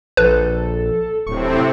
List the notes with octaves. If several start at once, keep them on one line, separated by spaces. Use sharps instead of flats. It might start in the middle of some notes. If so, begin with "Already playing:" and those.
A#1 A4 B4
D1 A2 C3 C4 C#6